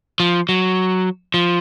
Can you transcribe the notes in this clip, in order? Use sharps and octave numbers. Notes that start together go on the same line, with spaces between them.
F3
F#3
F3